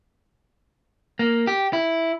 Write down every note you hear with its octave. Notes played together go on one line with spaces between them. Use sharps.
A#3
G4
E4